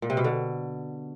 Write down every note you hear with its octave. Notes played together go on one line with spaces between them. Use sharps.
A#2
C3
B2
D3